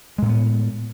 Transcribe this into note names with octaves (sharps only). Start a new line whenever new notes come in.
A2 G#3 A#3 B3